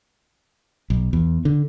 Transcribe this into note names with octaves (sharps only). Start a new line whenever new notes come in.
B1
E2
D3